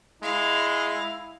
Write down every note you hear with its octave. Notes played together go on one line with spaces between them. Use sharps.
G#3 E4 F5